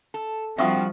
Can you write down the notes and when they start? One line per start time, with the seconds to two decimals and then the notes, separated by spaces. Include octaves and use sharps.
0.14 A4
0.58 G2 F3 G3 C4 F#4 E5 C#6 D#6